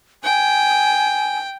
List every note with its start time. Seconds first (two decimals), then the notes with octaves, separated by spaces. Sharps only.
0.24 G5 G#5